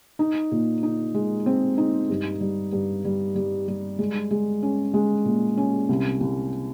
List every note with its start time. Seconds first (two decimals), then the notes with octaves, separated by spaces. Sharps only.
0.19 D#4
0.51 A#2
0.83 D#4
1.14 G#3
1.46 C4
1.78 D#4
2.10 G2
2.41 G3
2.72 G2
3.05 G3
3.36 G3
3.68 G3
3.99 G#3
4.31 G#3
4.63 C#4
4.94 G#3
5.25 A#2
5.57 C#4
5.89 C2
6.21 C2